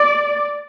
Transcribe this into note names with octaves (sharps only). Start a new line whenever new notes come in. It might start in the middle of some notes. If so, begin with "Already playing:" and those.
Already playing: D5